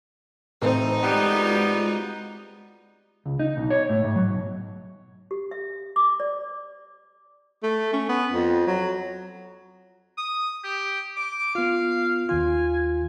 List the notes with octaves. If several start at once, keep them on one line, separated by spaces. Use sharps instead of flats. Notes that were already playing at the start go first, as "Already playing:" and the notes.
A1 C4 D#4 C5
C3 G3 G#3 B3 F4 F#4
C#2
D#4
B1
C#5
A2
G#2
F#3
B1
G4
E5
D6
D5
A3
C#4
B3
F2
F#3
D#6
G4
D6
B3 F4 F5
D#2 D#3 F4 G#5